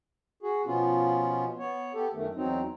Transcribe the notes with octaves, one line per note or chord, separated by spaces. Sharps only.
F#4 G#4
B2 F3 B3 C#4 F4
B3 C#5
B3 G4 A4
F#2 D#3 A3
E2 F#3 C4 D#4